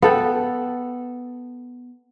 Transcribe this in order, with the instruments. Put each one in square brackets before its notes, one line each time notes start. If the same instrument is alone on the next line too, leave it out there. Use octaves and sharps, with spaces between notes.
[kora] B3 A4 G5